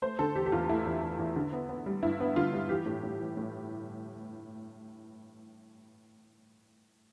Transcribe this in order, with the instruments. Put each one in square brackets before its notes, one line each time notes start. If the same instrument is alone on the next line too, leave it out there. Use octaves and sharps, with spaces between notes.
[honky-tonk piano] A3 C5
D3 A4
E2 G4
G4
E2 F4
A3 E4
E2
E2
E2
D3
B3
B3
G3
G2 E4
B3
D3 F4
G3
E3 G4
A2
A2
E3
A2